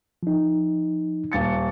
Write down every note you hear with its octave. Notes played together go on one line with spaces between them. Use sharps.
F3 D#4
D#1 A6 C#7